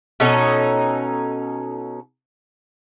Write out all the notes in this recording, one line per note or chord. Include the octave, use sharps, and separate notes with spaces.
B2 C#4 D#4 A4